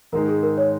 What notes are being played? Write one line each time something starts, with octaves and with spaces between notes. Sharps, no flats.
G#2 D#3 G#3 D#4 A#4
G#4
A#4
C#5